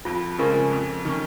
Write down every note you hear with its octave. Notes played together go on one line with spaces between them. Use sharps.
F2 F4
C#3 F3 G#3 C#4 A#4
F2
D#3 C#4